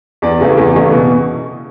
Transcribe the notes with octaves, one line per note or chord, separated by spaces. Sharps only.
E2 D5
C#3 E3 A3
E2
C#3 E3 A3
B2